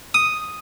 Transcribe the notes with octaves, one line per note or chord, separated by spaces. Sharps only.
D#6